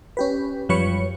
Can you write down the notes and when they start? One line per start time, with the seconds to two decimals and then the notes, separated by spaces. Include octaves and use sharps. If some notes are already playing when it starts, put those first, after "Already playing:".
0.17 C#4 G4 B4
0.69 F#2 F3 G3 B4 C#5 C#7